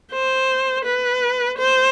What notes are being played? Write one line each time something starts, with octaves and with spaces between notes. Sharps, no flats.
C5
B4
C5